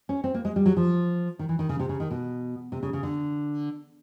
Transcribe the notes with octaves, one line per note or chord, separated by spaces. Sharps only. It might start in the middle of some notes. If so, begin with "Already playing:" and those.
C#4
C4
A#3
G#3
G3
F#3
F3
D#3
E3
D#3
C#3
C3
C#3
D#3
B2
C3
C#3
C#3
D3